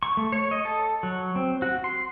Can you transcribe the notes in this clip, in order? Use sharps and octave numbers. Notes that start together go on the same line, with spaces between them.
C#6
A3
C#5
D#5
A4
F#3
C4
F#4
C6